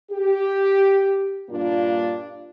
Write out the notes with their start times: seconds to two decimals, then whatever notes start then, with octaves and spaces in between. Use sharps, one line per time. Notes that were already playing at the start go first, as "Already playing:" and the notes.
0.11 G4
1.49 G2 A#2 A#3 D4 F4